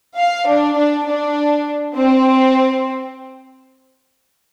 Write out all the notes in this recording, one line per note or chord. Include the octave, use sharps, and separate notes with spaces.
F5
D4
D4
D4
C4